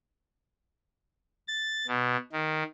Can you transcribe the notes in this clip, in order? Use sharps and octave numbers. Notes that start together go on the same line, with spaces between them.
A6
B2
D#3